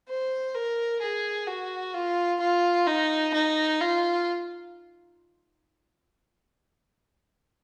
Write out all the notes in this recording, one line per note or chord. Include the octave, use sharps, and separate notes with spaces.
C5
A#4
G#4
F#4
F4
F4
D#4
D#4
F4